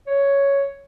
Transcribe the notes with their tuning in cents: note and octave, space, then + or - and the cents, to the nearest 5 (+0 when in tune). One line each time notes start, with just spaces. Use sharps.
C#5 +5